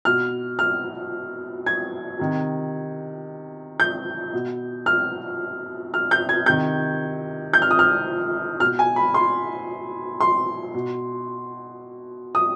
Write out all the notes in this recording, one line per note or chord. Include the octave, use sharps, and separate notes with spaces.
B2 F6
F6
G#6
C3 D#3
G6
B2
F6
F6
G6
G#6
C3 D#3 G6
G6
F6
D#6
F6
B2 F6
G#5
B5
C6
C6
B2
D#6